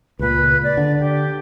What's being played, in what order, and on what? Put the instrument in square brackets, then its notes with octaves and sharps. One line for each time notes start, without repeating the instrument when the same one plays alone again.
[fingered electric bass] C#2 A#2 [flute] B4
[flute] D5
[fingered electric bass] D3
[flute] G4